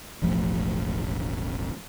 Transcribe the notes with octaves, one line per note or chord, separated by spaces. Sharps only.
E1 A1 F3 A3